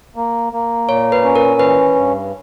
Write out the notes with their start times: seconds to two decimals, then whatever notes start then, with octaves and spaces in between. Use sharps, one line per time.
0.16 A#3
0.53 A#3
0.88 A#2 C#5
1.12 B4
1.23 C#4
1.36 A#4
1.59 E3 B4
1.96 G2